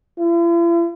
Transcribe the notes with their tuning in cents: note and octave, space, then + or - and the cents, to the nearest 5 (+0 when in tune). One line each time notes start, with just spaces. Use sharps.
E4 +45